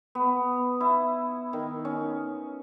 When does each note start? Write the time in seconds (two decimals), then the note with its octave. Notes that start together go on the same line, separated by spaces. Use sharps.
0.15 B3
0.81 E4
1.53 D#3
1.85 C#4